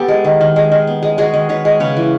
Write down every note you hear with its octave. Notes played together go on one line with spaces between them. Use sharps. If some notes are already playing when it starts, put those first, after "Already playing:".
Already playing: B3 G4 A4
G#3
D#3
D#3
G#3
D#3
B3
G#3
G#3 F#4 G#4
D#3
D#3 B4 C#5
G#3
C#3 B4 C#5
E3